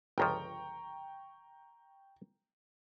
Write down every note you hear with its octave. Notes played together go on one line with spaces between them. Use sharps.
G1 C#2 F3 G5 A#5 C#6